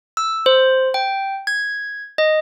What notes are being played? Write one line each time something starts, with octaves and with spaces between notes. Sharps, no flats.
E6
C5
G5
G#6
D#5